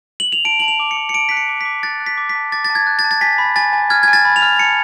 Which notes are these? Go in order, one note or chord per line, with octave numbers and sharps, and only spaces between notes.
F#7
F7
A5 D7
A5 F#7
F7
D6
C#7
D6
C#7
A5 D7
F#6 B6
C#7
D6
D6 B6
F#6 A6
F#6
B6
D6
B6
A5
D6 A6
A6
A5
G#6
F#6
A6
A5
A6
G#5 B6
B5
G#5 A6
G#5
F6 G#6
G#5 G#6
A6
B5
F7
F6
A5 C#7